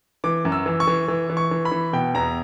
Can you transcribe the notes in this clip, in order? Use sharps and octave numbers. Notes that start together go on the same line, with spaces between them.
E3 D6
F#2
E6
E3
C#6
E3
E3
E3
C#6
E3
B5
E3
B2 G5
E2 A#5